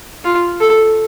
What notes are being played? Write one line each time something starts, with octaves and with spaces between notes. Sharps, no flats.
F4
A4